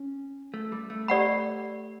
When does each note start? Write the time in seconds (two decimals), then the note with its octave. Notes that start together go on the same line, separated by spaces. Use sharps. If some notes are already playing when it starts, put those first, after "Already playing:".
Already playing: C#4
0.54 A3
0.72 G3
0.90 A3
1.08 G4 D5 F#5 B5